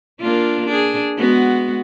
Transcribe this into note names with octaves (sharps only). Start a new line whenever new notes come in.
A#3 D4 F4
D4 G#4
G#3 B3 F#4